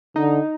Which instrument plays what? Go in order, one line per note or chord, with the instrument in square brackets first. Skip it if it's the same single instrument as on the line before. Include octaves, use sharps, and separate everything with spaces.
[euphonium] D3 [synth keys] D#4